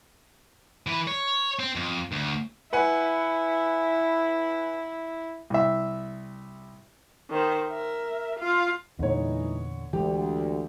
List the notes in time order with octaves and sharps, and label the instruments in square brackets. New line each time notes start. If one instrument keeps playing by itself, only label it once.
[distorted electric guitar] E3 B4
C#5
C4
F2
D2
[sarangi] E4 [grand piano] B4 F#5 G#5
[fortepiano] C2 E5
[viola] D#3 C5
A#4 E5
F4 F5
[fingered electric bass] E2 A#2 [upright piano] D3 C#5 [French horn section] E3 G#3 D#4
[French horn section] D2 [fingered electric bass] E3 G#3 [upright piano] G4